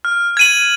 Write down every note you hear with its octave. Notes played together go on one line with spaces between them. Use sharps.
F6
G#6 D#7 F#7